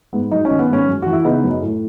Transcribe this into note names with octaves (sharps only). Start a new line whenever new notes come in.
G#2 B3
F#3 D#4
C#4
D#3
B3
G#2 C#4
F#2
E3 F#4
E4
C#3 B3 D#4
F#2
A2